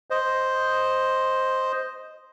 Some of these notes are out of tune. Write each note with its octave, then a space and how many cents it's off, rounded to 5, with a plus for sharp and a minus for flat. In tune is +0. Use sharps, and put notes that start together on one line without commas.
C5 +0 D#5 +0